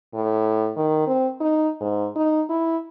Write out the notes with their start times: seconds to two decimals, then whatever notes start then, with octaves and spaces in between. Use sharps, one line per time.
0.14 A2
0.76 D#3
1.07 C4
1.40 D#4
1.81 G#2
2.16 D#4
2.49 E4